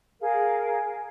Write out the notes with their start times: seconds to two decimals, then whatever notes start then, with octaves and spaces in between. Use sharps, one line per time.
0.20 G#4 A#4 F5